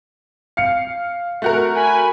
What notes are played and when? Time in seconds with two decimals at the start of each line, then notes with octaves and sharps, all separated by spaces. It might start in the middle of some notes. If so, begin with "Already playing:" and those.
0.57 F5 C#7
1.42 A3 F#4 A#4
1.75 G#5 B5